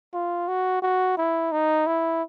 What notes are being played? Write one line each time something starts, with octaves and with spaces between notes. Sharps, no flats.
F4
F#4
F#4
E4
D#4
E4